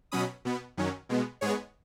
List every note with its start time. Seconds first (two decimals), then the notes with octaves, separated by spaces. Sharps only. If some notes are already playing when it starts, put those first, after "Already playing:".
0.12 B2 F#3 C#4 B5 D#6
0.45 B2 B3
0.77 F#2 D#3 F#3 C#4
1.09 B2 G#3 B3
1.41 G#2 G#3 B3 G#4 C#5